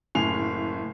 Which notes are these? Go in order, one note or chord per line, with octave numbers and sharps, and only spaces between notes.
F#1 A2 C#3 G#5 C7 F7